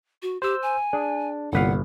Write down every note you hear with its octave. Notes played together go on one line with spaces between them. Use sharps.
F#4
G4 C5 E6
G#5
D4 G#4
G1 C2 A#2 B4 F5 F#5